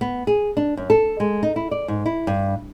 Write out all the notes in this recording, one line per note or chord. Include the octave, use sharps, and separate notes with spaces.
B3
G#4
D4
F#2
A4
G#3
D#4
E4
D5
G#2
E4
G2